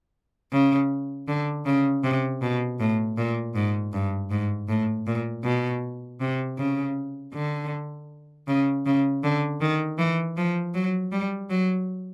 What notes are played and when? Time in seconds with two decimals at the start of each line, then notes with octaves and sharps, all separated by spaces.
0.52 C#3
1.28 D3
1.66 C#3
2.04 C3
2.42 B2
2.80 A2
3.17 A#2
3.55 G#2
3.93 G2
4.31 G#2
4.69 A2
5.07 A#2
5.44 B2
6.21 C3
6.58 C#3
7.34 D3
8.47 C#3
8.86 C#3
9.24 D3
9.61 D#3
9.98 E3
10.37 F3
10.75 F#3
11.12 G3
11.50 F#3